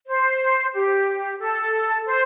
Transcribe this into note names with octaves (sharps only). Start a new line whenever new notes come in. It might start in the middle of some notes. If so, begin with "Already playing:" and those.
C5
G4
A4
C5